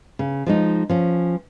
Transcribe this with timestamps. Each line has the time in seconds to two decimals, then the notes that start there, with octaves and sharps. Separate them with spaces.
0.19 C#3
0.46 F3 G#3 D#4
0.89 F3 C#4